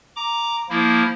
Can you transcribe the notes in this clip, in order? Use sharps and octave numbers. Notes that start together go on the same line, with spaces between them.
A#5 D6
F3 A#3 E4